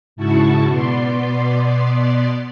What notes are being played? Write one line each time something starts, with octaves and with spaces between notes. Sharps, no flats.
G#2 C#3 E4 F#4 A5 C#6
B2 B3 D5 C6